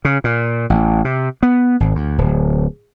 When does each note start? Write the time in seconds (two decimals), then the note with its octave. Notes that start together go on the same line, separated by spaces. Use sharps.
0.05 C#3
0.24 A#2
0.70 A1
1.05 C3
1.43 B3
1.80 G#1
1.95 D2
2.18 D1